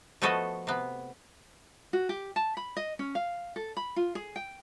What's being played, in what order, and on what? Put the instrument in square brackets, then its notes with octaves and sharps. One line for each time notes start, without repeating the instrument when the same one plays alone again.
[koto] F3 A3 B3 F#4 A4 D#5
C3 B3
[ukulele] F#4
G4
A5
B5
D#5
C#4
F5
A4
B5
F4
G#4
G5